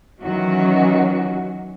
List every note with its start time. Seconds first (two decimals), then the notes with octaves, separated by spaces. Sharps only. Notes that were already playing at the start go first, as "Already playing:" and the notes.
0.21 D#3 E3 F#3 C#4 F#4